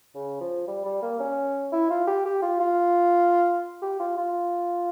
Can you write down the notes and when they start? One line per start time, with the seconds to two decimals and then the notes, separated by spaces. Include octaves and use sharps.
0.15 C#3
0.41 F3
0.67 G3
0.85 G3
1.02 A#3
1.19 C#4
1.72 E4
1.90 F4
2.07 G4
2.25 G4
2.42 F4
2.60 F4
3.82 G4
4.00 F4
4.17 F4